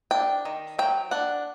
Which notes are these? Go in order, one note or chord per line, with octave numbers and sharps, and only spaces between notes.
D4 G5
D#3
F#3 G5
D4 F#5